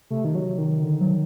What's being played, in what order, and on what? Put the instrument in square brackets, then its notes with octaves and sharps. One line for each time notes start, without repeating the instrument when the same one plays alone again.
[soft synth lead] C3 [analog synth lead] A3
[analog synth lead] D#3
F#3
D#3
[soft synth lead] D3
F#3